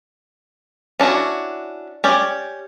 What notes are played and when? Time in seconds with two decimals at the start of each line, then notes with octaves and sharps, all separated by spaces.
1.00 C#4 D4 E4 F#4
2.04 C#4 G4 D5